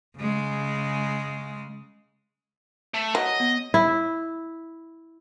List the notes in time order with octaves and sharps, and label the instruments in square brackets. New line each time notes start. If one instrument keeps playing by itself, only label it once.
[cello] C#3 G#3
[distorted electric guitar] A3
[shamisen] F#3 [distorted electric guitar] D#5
[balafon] B3
[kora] E4